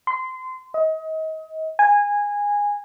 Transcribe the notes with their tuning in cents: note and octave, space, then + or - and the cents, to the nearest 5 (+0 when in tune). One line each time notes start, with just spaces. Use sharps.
C6 -25
D#5 +25
G#5 -15